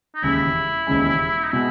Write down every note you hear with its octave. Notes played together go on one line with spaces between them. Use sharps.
D#4
E1 D#2 C#3 G#3 E4
E1 D#2 C#3 G#3
D#4
B2 G#3 E4